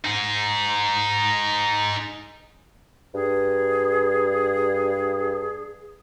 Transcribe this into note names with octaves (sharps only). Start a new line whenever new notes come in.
D#4 G#4
G2 G#4